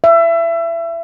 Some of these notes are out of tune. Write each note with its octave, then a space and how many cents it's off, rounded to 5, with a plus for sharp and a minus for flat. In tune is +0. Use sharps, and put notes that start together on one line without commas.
E5 +25